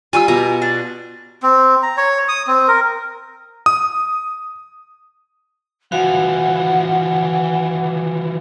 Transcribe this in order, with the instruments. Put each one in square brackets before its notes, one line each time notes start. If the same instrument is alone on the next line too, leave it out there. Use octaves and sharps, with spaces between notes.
[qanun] G3 F4 G4 [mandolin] G#5 D6 E6
[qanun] B2 F4 A#5 [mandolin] G#5
[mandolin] D4
[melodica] C4
A#5
C#5
D#6
C4
A#4
[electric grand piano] D#6
[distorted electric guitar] E3 F3 [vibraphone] F#4 F5 [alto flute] F#5